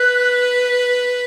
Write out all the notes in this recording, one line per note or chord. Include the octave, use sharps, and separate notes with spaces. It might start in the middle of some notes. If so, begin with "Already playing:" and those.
Already playing: B4 F#6